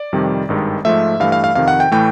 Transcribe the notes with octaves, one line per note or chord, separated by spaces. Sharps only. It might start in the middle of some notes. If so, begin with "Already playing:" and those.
Already playing: D5
F2 C3 D#3 G3
G#1 G2 D#3 G#3
G#2 F3 A3 E5
G2 E3 A3 F5
F5
F5
F2 C3 D#3 F5
F#5
G5
A2 E3 A3 G5